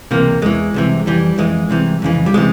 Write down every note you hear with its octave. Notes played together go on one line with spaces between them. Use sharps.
C#2 C3 E3 A#3
E2 E3 G#3
C2 C3 E3
F2 E3 G3
F2 E3 G#3
C2 C3 E3
F2 C#3 E3
G3
C3 E3 G#3